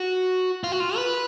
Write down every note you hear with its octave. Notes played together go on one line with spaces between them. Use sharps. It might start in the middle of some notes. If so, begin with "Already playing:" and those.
Already playing: F#4
F4
F#4
F4
B4